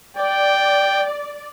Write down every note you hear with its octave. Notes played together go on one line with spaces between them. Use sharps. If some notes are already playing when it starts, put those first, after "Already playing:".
D5 G5